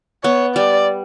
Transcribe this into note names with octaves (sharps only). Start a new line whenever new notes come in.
B3 C#5
G3 D5